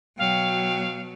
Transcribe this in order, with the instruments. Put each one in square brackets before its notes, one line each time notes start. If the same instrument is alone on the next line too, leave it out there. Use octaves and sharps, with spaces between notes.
[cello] B2 F#3 [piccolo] F5 [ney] G5